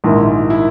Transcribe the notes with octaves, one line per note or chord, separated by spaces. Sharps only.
A#1 G#2 D#3 A#3 E4
E4